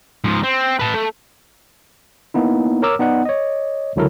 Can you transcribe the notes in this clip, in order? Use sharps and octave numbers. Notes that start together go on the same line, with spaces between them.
G#2 F3
C4
B4 A5
A3
A#3 B3 D#4 E4
A#4 C#5 A#5 D6 E6 F6
B3 D#4 D5 F#5
C#5 D#5
C#2 D3 F#3 E4 A4 A#4